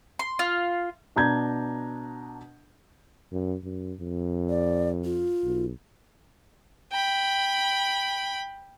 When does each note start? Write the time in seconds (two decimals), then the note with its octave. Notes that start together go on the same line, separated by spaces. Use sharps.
0.19 C6
0.39 F4
1.16 B2 D4 A#5 G6 G#6
3.32 F#2
3.64 F#2
4.00 F2
4.49 D5
5.04 F4
5.44 B1
6.92 G5 B5